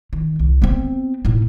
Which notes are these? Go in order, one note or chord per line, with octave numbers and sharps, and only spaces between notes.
D#3
C2
B3 C4
A2 D#4